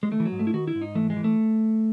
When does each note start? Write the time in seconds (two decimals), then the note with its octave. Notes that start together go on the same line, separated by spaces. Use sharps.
0.03 G#3
0.11 D#3 A3
0.20 E3
0.25 F#3
0.32 G#2
0.39 A3
0.47 E4
0.54 D#3 F#4
0.67 E4
0.75 G#2
0.81 D#4
0.95 E3 A3
1.10 G#3
1.17 E3
1.24 A3